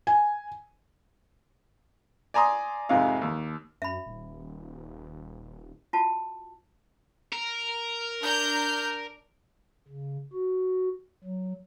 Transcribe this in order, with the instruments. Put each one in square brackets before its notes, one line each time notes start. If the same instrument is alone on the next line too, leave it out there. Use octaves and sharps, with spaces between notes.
[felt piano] G#5
[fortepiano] D5 G#5 A#5 C6 D#6
F2 G#2 C3 D#4 F5
D#2
[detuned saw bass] F#2 [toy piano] E5 B5
[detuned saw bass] D#1
[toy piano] F4 F#4 A5
[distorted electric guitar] A#4
[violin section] D4 A#5 G6
[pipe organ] C#3
F#4
F#3